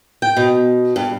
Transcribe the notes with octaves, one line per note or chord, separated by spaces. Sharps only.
G5
B2
G2